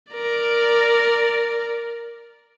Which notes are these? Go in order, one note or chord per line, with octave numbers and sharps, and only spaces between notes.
A#4 D5